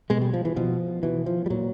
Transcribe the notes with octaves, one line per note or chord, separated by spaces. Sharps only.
B2 G#3
G3
F3
E3
B2 F3
B2 E3
F3
G3
A#2 F#3